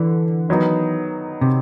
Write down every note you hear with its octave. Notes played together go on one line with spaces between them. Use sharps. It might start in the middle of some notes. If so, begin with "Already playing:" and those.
Already playing: D3 E3
D#3 F#3 B3 D#4
C3